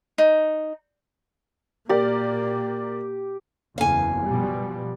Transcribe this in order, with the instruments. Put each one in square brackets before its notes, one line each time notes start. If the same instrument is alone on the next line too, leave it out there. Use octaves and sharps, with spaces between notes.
[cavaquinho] D#4
[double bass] A#2 A#3 [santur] G4 [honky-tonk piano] A#4 D5
[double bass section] F#1 E2 [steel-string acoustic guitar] F5 G#5
[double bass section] B2 F3 G3